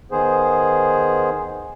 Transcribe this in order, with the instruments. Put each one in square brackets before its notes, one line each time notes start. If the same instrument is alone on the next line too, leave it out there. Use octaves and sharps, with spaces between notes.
[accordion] D#3 B3 G#4 C5